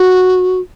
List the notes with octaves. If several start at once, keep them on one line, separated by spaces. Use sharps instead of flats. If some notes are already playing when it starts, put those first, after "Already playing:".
Already playing: F#4